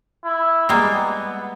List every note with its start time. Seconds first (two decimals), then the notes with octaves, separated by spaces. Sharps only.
0.24 E4
0.69 G3 G#3 A#3 B3